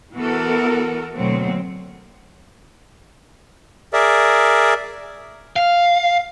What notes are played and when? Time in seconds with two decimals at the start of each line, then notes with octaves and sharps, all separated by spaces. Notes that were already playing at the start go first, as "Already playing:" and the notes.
0.16 E3 B3 F#4 A4 A#4
1.15 D2 B2 F#3 A#3 C4
3.93 G#4 A#4 D5 E5
5.56 F5